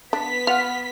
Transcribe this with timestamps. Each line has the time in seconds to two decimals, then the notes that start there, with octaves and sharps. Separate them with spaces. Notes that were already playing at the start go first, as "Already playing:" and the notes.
0.13 B3 D4 B6
0.47 F4 F#5 F6